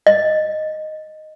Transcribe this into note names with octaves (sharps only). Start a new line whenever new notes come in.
D#5